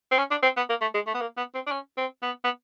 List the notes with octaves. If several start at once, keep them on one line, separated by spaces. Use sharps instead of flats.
C4
C#4
D4
C4
B3
A#3
A3
G#3
A3
B3
A#3
B3
C4
D4
C#4
C4
B3
B3